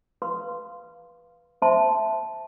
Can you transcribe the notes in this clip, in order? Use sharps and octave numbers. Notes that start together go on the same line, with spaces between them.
B4 F5 C6
C5 E5 A5 C6